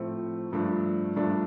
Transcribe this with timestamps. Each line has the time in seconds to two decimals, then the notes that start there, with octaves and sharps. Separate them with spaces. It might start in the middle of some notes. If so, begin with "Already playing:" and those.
Already playing: A2 F3 A3 C4
0.52 G2 F3 A3 D4
1.16 G2 F3 A3 D4